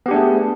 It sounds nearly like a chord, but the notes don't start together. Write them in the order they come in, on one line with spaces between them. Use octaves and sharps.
B3 G4 D4 A3 G#4